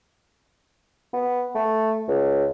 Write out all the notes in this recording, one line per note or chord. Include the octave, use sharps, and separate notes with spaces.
B3
A3
C#2